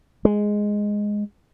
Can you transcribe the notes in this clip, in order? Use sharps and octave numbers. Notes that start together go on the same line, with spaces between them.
G#3